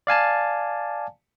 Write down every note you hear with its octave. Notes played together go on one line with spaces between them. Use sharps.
D5 F5 G#5 A5